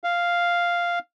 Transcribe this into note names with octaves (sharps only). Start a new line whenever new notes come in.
F5